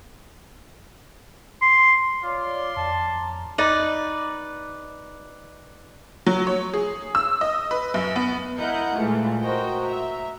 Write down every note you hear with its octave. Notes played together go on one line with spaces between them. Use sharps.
C6
F4 C#5 D5 C6 D6
F2 A5
A#5
D#4 B4 D5
F#3
C#5
G#4
E6
D#5
B4
F#2
B3
E4 A#4 D#5 F#5 G6 C#7
A#2 E3 G#3 A3 F4
F#4 A#4 C5 D#5 G5
E5 A#5